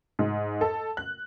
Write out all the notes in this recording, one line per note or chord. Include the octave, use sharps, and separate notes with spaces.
G#2
A4
F#6